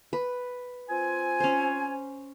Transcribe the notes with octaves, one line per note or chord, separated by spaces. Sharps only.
B4
C4 F4 G#5
C#4 C5